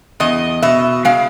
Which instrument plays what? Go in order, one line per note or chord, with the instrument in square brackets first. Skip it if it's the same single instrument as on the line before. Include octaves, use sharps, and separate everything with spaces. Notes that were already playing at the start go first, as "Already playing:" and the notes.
[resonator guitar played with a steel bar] E2 D#5
B2 E5
G#3 F5